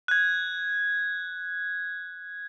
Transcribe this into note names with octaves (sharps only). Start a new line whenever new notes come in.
F#6 G#6